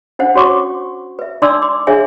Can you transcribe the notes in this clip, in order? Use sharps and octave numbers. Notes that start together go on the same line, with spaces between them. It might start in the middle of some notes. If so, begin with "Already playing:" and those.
C#4 D4 C5 F#5
C#4 F#4 C#5 C#6 D6
B4 E5
D4 D#4 D5 C6 D6 E6
C6 D6
D4 G#4 C#5 E5 G#5